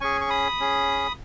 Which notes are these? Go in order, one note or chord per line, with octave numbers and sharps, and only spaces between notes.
C#4 G#4 G#5 C#6
C#6
B5 D#6
C#4 G#4